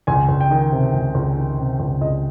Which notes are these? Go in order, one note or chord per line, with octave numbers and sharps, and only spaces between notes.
C#2 G#5
C#2
G5
D#3
C3
C#2
C#2
D#3
C3
C#2
C#2 D#5